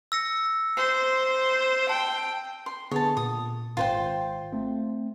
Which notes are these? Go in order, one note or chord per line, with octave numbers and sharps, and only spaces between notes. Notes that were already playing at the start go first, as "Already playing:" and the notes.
E6 A#6 C#7
C5 C7
G5 A5
C6
D3 B3 G#4 C#5 A5
A#2 D#6
G#1 F4 C5 G5
A3 C4